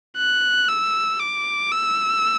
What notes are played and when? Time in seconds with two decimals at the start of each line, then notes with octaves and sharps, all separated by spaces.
0.17 F#6
0.68 E6
1.20 D6
1.72 E6